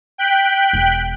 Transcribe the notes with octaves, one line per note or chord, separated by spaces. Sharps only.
G5 F#6 B6
E1